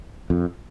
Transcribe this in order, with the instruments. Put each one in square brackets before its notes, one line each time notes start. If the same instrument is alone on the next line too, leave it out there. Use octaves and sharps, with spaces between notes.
[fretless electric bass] F2